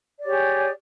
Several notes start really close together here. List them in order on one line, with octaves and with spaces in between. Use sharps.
D5 C#5 G4 G#4